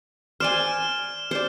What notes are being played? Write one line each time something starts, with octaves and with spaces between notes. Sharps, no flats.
C5 D5 G#5 F6 E7 G7
C5 D5